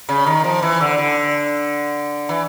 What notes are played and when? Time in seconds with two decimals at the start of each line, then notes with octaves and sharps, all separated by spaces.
0.09 C#3
0.26 D#3
0.44 F3
0.62 E3
0.81 D3
0.98 D3
2.29 E3